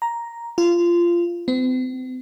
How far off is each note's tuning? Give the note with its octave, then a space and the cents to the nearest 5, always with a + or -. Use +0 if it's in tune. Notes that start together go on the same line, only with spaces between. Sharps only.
A#5 +5
F4 -20
C4 -45